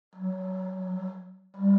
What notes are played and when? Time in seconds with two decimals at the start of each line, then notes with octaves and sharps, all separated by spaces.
0.16 F#3
1.57 G3